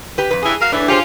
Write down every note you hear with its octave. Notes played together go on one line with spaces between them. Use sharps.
G4 B4
F2 B4
G2 C#3 E3 G#4
F#4 A#4 F5
E2 A2 E3 D4 B4
C#4 F4 G4 G#4 C5